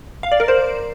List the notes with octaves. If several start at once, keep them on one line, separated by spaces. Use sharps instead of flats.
F5
D5
A#4
C5